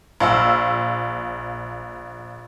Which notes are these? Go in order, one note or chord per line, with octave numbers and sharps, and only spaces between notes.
A#1 F5 E6